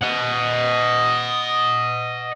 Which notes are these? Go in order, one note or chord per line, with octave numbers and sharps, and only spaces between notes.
D#5 F#5